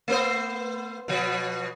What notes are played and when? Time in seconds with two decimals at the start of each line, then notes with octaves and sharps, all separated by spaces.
0.08 A3 B3 C5
1.08 B2 F3